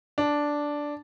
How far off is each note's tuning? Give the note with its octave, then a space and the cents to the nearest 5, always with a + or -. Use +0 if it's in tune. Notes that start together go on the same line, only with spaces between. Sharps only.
D4 -5